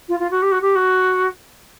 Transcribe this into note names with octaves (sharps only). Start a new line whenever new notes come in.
F4
F4
F#4
G4
F#4
G4
F#4